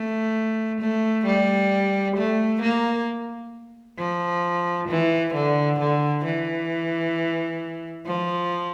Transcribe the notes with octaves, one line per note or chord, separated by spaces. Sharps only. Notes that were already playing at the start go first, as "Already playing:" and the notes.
Already playing: A3
A3
G3
A3
A#3
F3
E3
D3
D3
E3
F3